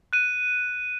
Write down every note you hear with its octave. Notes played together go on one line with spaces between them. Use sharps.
F#6 D#7